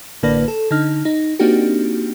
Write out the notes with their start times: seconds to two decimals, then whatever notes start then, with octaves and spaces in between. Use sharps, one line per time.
0.23 A1 D3 A#3 B4 D5 A#6
0.48 A4
0.71 D3 D#4 F6
1.05 D#4
1.39 A#3 C4 D4 D#4 F#4 G4